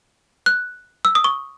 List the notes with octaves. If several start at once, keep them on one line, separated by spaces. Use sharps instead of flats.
F#6
E6
D#6
C#6